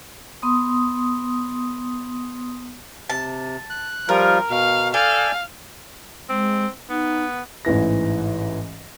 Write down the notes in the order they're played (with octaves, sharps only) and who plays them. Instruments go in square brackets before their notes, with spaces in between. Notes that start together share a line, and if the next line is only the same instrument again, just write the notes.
[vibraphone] B3 C6 D#6
[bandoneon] C3 [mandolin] A5
[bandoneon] F#6
[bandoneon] F3 G3 F4 [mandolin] A#4
[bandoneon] B2 [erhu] F5
[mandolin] A4 [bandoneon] D5 G5 G#5 [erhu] F5
[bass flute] G#3 [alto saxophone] C4
[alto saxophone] B3 [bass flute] D#4
[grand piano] A1 G#2 E3 A#6